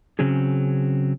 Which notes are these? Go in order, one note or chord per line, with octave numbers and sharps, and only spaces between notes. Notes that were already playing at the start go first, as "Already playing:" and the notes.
C#3 F#3 C4 C#4 G#4